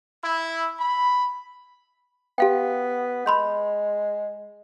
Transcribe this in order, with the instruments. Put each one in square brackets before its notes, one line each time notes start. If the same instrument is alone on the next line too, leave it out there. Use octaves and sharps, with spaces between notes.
[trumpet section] E4
B5
[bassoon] B3 [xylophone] G4 F5 G5
[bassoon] G#3 [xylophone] B5 C6 G6